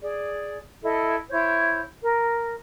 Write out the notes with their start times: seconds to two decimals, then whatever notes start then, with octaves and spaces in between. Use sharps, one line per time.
0.01 G#4 D5
0.81 E4 A4 D#5
1.29 E4 C5 C#5 G6
2.03 A#4